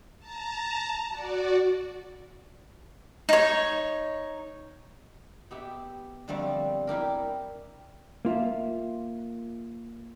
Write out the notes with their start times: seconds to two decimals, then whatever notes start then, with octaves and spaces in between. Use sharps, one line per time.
0.19 A5 A#5
1.10 F#4 D5
3.29 D#4 C#5
5.51 B3 G4 E5
6.28 D3 F3 G3 A3 B3 C4
6.87 G3 E4 G4 A#4
8.25 A#3 F4 E5